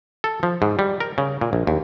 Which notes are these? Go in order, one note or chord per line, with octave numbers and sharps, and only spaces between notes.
A4
F3
G#2
G3
A#4
C#3
A#2
A#1
D#2